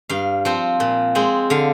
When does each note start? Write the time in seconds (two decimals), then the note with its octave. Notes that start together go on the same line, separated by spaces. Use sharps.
0.09 G2 F5
0.45 F3 C4
0.80 A#2
1.15 G#3 C4
1.50 D3 F5